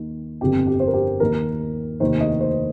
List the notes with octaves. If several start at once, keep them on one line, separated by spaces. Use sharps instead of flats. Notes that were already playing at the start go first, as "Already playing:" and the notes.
Already playing: D#2 D#3
G1 F2 C3 G4
G4
C5
A#4
G4
D#2 D#3 A#4
F1 D#2 D#3 C5
D#5
C5